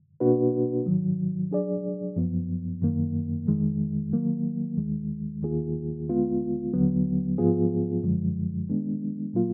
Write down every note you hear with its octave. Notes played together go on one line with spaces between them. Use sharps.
B2 A#3 D4 F#4 B4
G#2 D#3 F#3
F#3 D4 G#4 D5
F#2 F3 B3
F#2 D#3 A#3
F2 D#3 G#3
D#3 F#3 A#3
D#2 D#3 G#3
D#2 D#3 A#3 F4 G#4
D2 D3 G#3 B3 F4
D#2 D3 F#3 B3
G#2 F3 B3 F4 G#4
F#2 D3 F3 G#3
D#3 G#3 B3 D4
A#2 F#3 A#3 F4